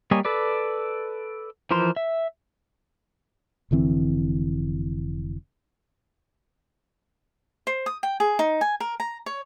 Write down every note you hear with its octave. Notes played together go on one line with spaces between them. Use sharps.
G3 A#3 C#5 D#5 G#5
A4 B4 D5
E3 F3 A#4 C5 C6
E5
F1 D3 E3 C4
C5
D#6
G5
G#4
D#4
G#5
A#4
A#5
C#5